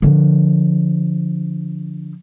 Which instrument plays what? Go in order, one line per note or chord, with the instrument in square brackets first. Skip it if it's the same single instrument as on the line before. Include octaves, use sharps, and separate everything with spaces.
[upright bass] D3 F3